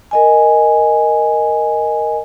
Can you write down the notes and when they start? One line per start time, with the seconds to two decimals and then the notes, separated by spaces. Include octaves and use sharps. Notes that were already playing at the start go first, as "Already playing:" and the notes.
0.11 A#4 D#5 G#5